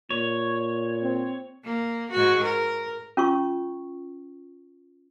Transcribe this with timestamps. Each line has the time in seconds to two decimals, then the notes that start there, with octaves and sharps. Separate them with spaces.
0.10 A#2 C#5
1.03 C4
1.64 A#3
2.11 G#2 F#4
2.44 A#4
3.17 C#4 F4 C#6